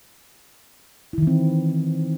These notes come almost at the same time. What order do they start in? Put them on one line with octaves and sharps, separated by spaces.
E4 D#3 E3 C4